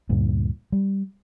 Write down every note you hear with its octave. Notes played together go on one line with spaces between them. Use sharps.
D2 G2 A#2
G3